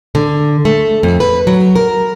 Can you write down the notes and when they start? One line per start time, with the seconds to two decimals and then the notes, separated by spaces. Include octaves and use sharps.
0.15 D3
0.65 A3
1.03 F2
1.20 B4
1.47 F#3
1.76 A#4